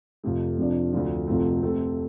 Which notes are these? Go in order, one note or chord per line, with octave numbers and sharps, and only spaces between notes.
F1 F2 C3 A3
F1 F2 C3 F3 D4
D2 D3 F3
F1 F2 F3 A3 C4
C3 A3 C4 A4